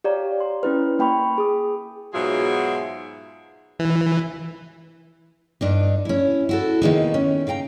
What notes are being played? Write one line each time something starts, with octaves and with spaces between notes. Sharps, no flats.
G4 C#5 D5 F5 A#5
C6
C#4 E4 B4
A#3 G5 B5 C#6
G#4 D#6
G#2 B2 F#3 F4 G#4 E5
E3
G2 D4 D#4
C#4 E4
E4 F#4 A4
D#3 F3 G#3 A#3 B3 D#4
C#4
C#3 F5 G5 A#5